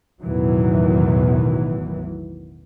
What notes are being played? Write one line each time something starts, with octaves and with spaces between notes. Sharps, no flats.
A1 E2 B2 D#3 E3 F#3